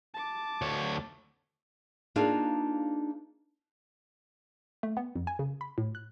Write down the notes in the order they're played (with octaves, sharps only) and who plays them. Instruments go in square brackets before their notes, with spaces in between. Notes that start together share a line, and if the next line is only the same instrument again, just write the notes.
[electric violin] A5 D6
[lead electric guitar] D2 C#5
[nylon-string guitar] A#3 D4 D#4 F4 G#4 B4
[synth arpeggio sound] A3
B3
F2
G#5
C#3
B5
A2
F#6